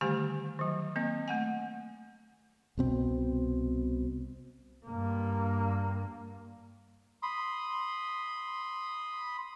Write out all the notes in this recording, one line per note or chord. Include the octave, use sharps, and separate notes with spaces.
D3 D#3 G3 A3 G4 G#5
D#3 F#3
A#3 C4 D#5
A3 F#5 G#5
C2 B2 C4
G2 A#3
B5 C6 D#6